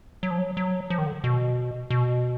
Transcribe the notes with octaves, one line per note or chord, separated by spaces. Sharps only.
F#3
F3
F#3
F#3
F3
D#3
D3
B2
B2